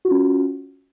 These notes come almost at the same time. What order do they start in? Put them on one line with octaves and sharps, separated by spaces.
F#4 F4 C#4